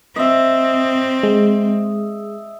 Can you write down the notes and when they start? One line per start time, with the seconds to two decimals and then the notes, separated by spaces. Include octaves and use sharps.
0.16 C4 D#5 E5
1.23 G#3